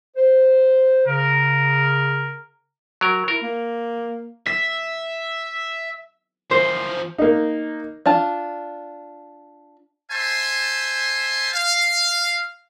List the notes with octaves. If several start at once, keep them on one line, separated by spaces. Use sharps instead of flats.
C5
C#3 A#4
F#3 A#4
E4 A#4
A#3
E5 B6
E3 F3 C5
A#3 D#4
D4 F4 A5
C5 E5 G#5 A5 C6
F5